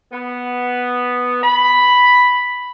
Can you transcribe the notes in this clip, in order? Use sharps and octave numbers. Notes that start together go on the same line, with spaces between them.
B3
B5